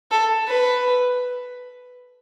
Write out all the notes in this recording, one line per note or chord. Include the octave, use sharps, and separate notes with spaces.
A4
B4